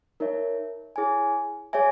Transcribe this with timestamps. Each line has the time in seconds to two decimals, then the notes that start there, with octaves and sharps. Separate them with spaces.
0.20 D#4 A#4 C#5 E5
0.96 E4 G#4 C#5 G#5
1.73 G#4 C#5 E5 G#5